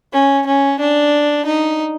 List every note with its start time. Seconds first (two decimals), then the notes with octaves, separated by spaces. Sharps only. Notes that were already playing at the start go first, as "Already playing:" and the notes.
0.13 C#4
0.46 C#4
0.80 D4
1.46 D#4